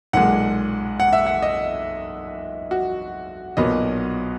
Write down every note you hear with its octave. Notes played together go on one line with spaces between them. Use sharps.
B1 A#2 G#3 F#5
F#5
E5
F#5
D#5
F#4
B1 A#2 F#3 B3 D#5